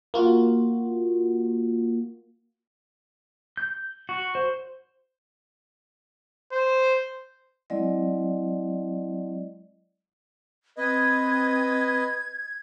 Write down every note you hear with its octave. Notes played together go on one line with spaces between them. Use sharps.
A#3 F4 F#4
G6
F#4
C5
C5
F#3 G#3 C4 E4 D5 D#5
C4 B4 D#5 G#6